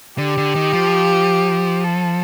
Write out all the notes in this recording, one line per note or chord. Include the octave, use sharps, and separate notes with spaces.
D3 G4
D3
D#3
F3
A4